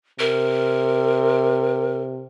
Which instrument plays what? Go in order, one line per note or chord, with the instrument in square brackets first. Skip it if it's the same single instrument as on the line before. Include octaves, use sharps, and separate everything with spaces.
[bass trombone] C3 [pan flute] A#4